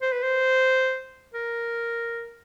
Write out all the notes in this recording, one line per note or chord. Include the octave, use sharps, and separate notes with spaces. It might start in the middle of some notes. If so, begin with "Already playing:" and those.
C5
B4
C5
A#4